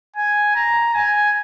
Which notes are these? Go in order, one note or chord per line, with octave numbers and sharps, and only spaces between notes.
G#5
A#5
G#5